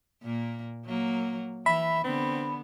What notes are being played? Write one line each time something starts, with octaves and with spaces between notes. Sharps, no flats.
A#2 A#3
F#3 A#3
E3 E5 B5
D3 B3 C4